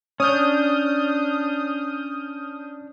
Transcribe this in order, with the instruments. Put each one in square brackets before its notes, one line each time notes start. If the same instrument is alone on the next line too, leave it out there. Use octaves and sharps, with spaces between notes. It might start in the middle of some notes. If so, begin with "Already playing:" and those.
[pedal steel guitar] C#4 D4 [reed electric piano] C#5 [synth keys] D#6 F6 G6